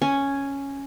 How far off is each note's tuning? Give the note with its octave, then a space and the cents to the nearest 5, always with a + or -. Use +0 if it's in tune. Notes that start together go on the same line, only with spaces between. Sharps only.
C#4 +0 G#5 +0